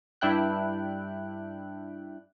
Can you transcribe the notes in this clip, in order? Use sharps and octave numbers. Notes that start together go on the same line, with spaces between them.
G2 D4 E4 G5 F#6